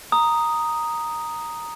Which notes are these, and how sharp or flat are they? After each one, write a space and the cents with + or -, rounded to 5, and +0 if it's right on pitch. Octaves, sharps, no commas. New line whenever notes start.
A#5 +0 D#6 +0